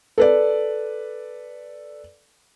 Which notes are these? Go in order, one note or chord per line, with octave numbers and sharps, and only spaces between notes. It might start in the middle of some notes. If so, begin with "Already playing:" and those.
A4 B4 D5